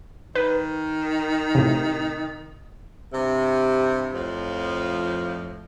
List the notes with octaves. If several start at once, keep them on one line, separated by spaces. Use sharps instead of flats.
D#3 B4
A2 C3
G2 C3
F2 A2 F3